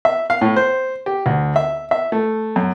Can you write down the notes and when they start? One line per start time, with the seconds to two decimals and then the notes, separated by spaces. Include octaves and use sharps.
0.05 E5
0.30 F5
0.41 A2
0.56 C5
1.06 G4
1.26 D2
1.56 E5
1.91 E5
2.12 A3
2.56 F#2